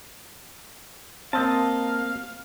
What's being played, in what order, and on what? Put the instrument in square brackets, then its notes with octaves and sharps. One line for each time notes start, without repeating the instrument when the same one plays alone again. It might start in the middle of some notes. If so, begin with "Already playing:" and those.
[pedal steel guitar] A#3 D#5 A5 [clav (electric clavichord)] C4 [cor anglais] F5